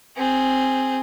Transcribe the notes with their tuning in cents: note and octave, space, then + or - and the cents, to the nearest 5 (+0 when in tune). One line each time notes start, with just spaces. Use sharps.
C4 +0 G#4 +0